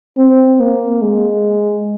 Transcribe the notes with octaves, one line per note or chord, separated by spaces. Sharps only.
C4
A#3
G#3